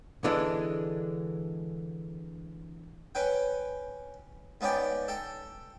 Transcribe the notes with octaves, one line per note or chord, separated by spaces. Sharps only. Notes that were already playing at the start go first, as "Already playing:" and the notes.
D3 E3 G#3 D4
C#4 B4 G5
G#2 B3 C#4 D5 G5
A4 G5